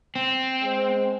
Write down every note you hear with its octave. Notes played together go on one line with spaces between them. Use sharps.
C4
G#3 C5